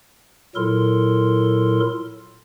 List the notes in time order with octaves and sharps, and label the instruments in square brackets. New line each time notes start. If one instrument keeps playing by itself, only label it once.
[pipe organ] A#2 F#3 E4 A4 A#4 C6